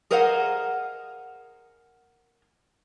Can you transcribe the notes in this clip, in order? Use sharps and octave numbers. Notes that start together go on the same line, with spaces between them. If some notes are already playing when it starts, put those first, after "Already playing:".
G#4 A#4 C5 D#5 F5 F#5